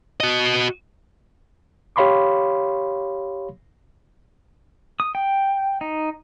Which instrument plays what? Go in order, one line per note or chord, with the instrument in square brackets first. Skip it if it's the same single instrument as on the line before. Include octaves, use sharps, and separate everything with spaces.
[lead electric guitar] F#4 D#5
[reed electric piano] G4 C#5 F5 B5 C6 D6
[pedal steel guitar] D#6
G5
D#4